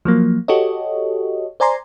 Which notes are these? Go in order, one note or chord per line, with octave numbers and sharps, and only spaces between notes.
F3 F#3 A#3
F#4 G4 A4 C#5 D#5
C5 D5 G#5 A#5 C6